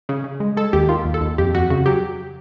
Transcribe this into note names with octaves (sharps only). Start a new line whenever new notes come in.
C#3
C#3
G#3
G#3 A4
D#2 G4
D#3 F4
D#2
A4
D#2
F2 G4
F2 F#4
C#3 F#4
F#3 G4